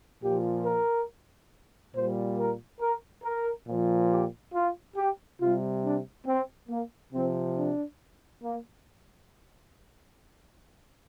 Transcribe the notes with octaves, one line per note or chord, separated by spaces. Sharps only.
A#2 F3 G4
A#4
A#2 G3 C5
A#4
A#4
A#4
A#2 F3
G4
F4
G4
C3 G3 F4
D4
C4
A#3
C3 F3 C4
D4
A#3